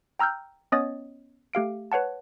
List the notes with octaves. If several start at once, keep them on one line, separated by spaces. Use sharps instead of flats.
G5 A#5 E6 F6 G6
B3 C#4 C#5 D#5 D#6 A6
A3 G4 F5 D7
B4 C#5 F#5 A5